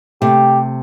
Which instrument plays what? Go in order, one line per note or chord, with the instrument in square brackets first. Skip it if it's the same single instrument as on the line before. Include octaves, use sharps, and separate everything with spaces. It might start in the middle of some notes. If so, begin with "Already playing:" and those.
[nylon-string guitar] C3 A3 [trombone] G4